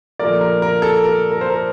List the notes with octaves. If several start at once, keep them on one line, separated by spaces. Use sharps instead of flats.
A#2 F3 A3 A#4 D5
A#4
A#4
A4
A#4
A#4
C5
A#4